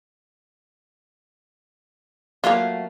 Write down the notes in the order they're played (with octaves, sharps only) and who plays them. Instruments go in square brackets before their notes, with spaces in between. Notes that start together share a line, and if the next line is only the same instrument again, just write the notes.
[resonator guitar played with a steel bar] F#3 A3 F5 [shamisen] A#3 F4